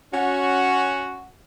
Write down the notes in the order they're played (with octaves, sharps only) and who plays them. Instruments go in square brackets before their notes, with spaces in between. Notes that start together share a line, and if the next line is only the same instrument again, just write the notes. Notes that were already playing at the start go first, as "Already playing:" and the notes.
[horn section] C#4 F#4